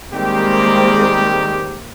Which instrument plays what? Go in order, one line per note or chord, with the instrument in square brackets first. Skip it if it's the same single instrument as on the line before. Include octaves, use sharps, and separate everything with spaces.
[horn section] D#3 G3 G4 [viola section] G#3 A#3 C4